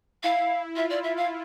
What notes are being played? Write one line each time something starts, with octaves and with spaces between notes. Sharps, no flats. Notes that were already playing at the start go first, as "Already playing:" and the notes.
E4 F5
F4 E5
D5
E5
F5